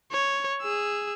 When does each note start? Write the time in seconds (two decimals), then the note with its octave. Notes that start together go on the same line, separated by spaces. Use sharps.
0.11 C#5
0.62 G#4 E6